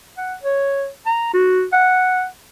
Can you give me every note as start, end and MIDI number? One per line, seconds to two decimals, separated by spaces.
0.17 0.35 78
0.43 0.88 73
1.06 1.31 82
1.33 1.64 66
1.73 2.25 78